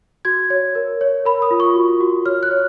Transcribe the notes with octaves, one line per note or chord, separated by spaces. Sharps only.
F#4 G#6
C#5
A#4
C#5
A#4 B5
D#6
F4
C#6
F#4
F#4
C#5 F6
F#6
C#5